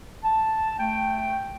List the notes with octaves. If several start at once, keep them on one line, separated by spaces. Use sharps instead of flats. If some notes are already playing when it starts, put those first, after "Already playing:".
A5
A3 G5